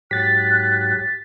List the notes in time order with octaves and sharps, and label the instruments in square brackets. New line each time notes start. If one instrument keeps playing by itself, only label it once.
[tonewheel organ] G#2 F#3 G4 [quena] F#6 [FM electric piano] A6 B6